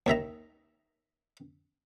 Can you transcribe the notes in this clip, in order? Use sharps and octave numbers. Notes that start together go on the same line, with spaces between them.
D#2 D#3 E5 A#5